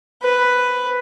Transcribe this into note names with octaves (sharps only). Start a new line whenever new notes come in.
B4